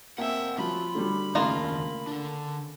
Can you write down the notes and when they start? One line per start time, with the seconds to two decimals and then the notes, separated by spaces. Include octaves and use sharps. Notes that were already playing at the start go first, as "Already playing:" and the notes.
0.18 A#3 C4 E5 F#5 G5
0.58 F3 F#3 F4 B5
0.95 D3 F#3 G3
1.35 D#2 C#3 A3 A#3 F4 A#4
2.07 D3 D4